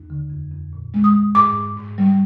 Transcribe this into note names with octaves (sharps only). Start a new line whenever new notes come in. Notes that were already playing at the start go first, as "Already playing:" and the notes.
Already playing: D#2
D3
F2
F2
A#2
G#3
D#6
G#3
G#2 D6
G#2
G#2
G3